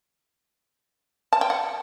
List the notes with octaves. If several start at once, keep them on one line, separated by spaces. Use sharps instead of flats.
A5
G5
F#5